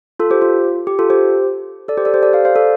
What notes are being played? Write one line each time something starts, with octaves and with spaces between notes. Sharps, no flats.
F4 A4
G4 C5
F4
G4
F4 A4
G4 C5
A4 D5
G4 C5
A4 D5
G4 C5
A4 D5
C5 F5
C5 F5
A4 D5